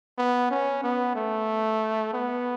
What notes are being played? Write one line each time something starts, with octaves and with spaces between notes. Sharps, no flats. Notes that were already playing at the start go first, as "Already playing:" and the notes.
B3
C#4
B3
A3
B3